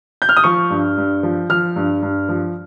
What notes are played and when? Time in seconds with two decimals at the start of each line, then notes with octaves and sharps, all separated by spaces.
0.22 G6
0.29 F6
0.37 D#6
0.44 F3 C#6
0.70 G2
0.97 G2
1.23 F3
1.49 F3 F6
1.76 G2
2.02 G2
2.29 F3